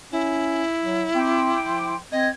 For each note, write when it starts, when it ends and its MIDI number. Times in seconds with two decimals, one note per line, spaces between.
0.12 0.63 61
0.12 1.94 64
0.83 1.06 54
1.15 1.54 60
1.15 1.96 79
1.15 1.96 84
1.15 1.96 86
1.63 1.98 53
2.12 2.30 60
2.12 2.29 75
2.12 2.31 92